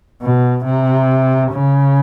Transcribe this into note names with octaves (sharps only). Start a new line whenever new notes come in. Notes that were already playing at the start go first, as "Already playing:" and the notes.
B2
C3
C#3